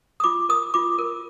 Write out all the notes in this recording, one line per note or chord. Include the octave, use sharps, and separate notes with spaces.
D#6
F4 D6
A#4 D#6
F4 D6
A#4